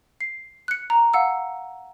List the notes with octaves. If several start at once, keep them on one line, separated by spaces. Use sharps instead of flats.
C7
F#6 C#7
A#5
F5 F#5 E6